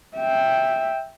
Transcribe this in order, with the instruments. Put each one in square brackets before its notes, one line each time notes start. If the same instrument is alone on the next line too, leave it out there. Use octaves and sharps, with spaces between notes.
[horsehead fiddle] E5 G5